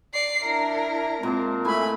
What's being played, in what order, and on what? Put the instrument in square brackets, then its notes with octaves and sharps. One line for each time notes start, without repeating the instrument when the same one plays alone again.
[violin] D5 C7
[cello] D4 E4 [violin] A#4
[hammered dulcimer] A#2 A5 [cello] G#3 C4
[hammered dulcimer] A3 E4 [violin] G#5 B5